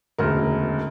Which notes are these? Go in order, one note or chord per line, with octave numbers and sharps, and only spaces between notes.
E1 D2 C#3 A#4